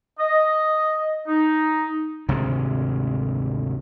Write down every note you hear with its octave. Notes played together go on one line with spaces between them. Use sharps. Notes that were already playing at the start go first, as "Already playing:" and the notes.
D#5
D#4
G#1 D2 C3 G#3